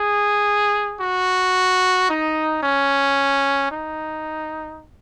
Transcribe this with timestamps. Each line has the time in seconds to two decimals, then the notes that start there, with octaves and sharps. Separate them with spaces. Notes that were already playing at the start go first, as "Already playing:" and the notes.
Already playing: G#4
1.01 F#4
2.09 D#4
2.63 C#4
3.71 D#4